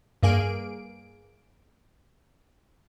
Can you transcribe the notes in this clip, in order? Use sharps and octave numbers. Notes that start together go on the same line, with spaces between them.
G2 A#3 G#4 D7